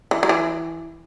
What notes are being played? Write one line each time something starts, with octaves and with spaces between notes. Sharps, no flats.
E3
F#3
E3